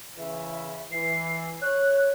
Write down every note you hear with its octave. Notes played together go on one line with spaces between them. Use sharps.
C#3 E3 E5
E3 C7
C#5 F#6